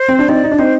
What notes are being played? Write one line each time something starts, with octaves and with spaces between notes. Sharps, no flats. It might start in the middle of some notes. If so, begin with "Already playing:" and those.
Already playing: C5
C4
D4
C4 D#4 D5
D#4
D4
C4 D#4 C5